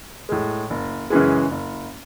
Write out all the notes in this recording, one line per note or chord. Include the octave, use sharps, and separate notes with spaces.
A2 G#3
F#1
F#2 C#3 E3 G#3
F#1